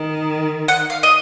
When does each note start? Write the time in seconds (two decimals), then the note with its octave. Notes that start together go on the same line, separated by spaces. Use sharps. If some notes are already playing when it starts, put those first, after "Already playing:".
Already playing: D#3
0.68 F#5
0.90 F5
1.03 D#5